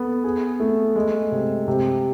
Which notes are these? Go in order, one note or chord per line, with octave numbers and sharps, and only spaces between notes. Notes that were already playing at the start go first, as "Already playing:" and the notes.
Already playing: B3 A4
G#4
A3
G#3
C3
C3